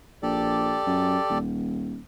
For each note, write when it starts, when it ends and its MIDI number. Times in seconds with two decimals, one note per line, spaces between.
0.23 0.78 34
0.23 1.38 67
0.23 1.38 69
0.23 1.38 74
0.87 1.18 42
1.30 1.99 27